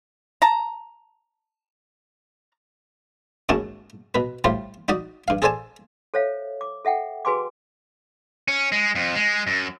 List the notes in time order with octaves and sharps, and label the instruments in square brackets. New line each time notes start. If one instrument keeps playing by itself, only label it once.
[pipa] A5 A#5
[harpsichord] D#2 G#2 C#4 F#4 A5
B2 B4
A2 G3 F4 C5
D#4 F#4 D5 D#5
G2 F5
G#4 A4 C5 D5 G#5 A5
[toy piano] A4 C5 C#5 E5 F5
D6
A4 E5 F#5 G5
F#4 G#4 B4 G#5 C6 D6
[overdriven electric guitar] C#4
G#3
F2
G#3
F#2